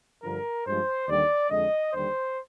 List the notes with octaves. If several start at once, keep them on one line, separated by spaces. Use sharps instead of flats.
G2 D3 F3 A#4
G2 F3 G#3 C5
D#2 D3 G3 D5
F2 D3 G#3 D#5
D#2 D3 G3 C5